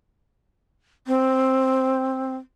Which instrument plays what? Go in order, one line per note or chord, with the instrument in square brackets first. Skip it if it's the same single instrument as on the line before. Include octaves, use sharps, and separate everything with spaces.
[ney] C4